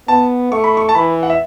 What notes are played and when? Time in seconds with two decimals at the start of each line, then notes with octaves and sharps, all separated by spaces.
0.08 B3 A5
0.52 A3 C#6
0.64 B5
0.77 C#6
0.89 A5
0.95 E3 B5
1.23 F#5
1.30 E5